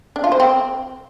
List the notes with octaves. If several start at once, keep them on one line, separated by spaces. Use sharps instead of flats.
D4
F4
C5
C4